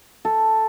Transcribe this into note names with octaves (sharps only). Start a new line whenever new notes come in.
A4